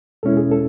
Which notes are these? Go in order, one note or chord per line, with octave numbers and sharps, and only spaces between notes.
E2 B2 G#3 C#4 E4 A4
G#4
A4